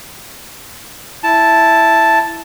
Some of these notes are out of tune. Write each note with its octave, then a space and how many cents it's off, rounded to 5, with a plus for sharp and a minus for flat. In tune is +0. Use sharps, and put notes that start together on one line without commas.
E4 +0 A5 +0